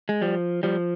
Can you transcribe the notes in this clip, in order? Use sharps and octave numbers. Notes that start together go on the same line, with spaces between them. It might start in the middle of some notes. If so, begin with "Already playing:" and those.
G#3
F3 G3
F3 G3